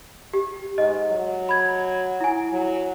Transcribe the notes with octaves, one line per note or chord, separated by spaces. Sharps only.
G4
G#2 D#5
F#3
B5 G#6
E4 G#5
F#3